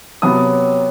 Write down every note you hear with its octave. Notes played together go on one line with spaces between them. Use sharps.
C3 F#3 B3 D#6